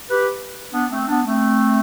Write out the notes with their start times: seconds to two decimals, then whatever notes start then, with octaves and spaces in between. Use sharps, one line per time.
0.10 G4 B4
0.73 B3 D4
0.91 A3 C4
1.08 B3 D4
1.26 A3 C4